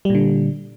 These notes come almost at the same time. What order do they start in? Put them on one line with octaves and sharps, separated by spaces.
G3 A#2 D3